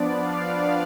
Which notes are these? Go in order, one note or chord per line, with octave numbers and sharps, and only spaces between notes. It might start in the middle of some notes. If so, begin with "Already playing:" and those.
Already playing: F3 B3 D4 D5
F5